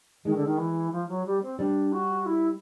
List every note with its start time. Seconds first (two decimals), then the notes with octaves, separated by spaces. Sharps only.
0.24 D#3 G#3
0.35 D3
0.45 D#3
0.57 E3
0.92 F3
1.08 F#3
1.25 G3
1.42 C4
1.59 G3 D4
1.92 F#4
2.26 E4